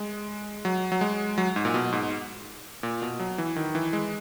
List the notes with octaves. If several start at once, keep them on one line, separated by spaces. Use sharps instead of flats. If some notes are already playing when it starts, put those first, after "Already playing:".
Already playing: G#3
F#3
F#3
G#3
F#3
G#2
A#2
B2
G#2
A#2
B2
F#3
E3
D#3
E3
G#3